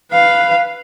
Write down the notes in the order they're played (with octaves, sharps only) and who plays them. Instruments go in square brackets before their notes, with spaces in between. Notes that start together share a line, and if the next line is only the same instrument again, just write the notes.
[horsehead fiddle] B4 F5